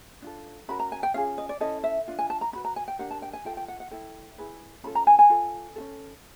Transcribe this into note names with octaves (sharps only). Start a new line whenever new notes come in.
D4 F4 A4
C#4 F#4 A#4 B5
A#5
G#5
G5
C#4 F4 G#4 F5
D#5
D5
C#4 E4 A4 D#5
E5
D4 F4
G#5
A5
A#5
C#4 F#4 B4 B5
A#5
G#5
G5
D4 G4 A#4 F#5
A5
G5
G#5
F4 A4 G5
G5
F#5
F#5
E4 A4 G5
E4 G#4 B4
C#4 F4 A4 B5
A#5
G#5
G#5
F4 A4
C#4 F4 A4